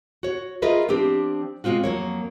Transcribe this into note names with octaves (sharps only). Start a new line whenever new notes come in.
F#4 C#5
F4 G#4 A#4 B4 D#5 E5
F3 C4 D4 G4
C3 G#3 C4 F4 F#4
F2 F#3 A#3 C#5